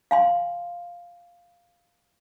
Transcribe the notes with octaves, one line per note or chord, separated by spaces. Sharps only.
F5 G#5 C6